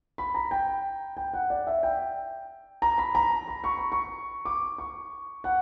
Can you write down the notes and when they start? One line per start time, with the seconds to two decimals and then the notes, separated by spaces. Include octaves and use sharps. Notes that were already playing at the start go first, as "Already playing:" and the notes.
0.18 B5
0.35 A#5
0.51 G5
1.17 G5
1.34 F#5
1.50 D5
1.67 E5
1.83 G5
2.82 A#5
2.98 B5
3.15 A#5
3.48 B5
3.64 C#6
3.77 B5
3.92 C#6
4.45 D6
4.78 C#6
5.44 F#5